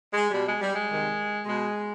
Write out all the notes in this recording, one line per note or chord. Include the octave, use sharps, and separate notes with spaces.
G#3
B2 G3
G#3
G3
G#3
C3 D#3
B2 G#3